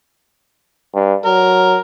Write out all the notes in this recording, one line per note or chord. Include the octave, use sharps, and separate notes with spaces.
G2
F#3 A#4